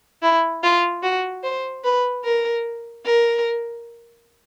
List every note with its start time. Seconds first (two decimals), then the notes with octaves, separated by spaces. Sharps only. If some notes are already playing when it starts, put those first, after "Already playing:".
0.22 E4
0.63 F4
1.03 F#4
1.44 C5
1.84 B4
2.25 A#4
3.06 A#4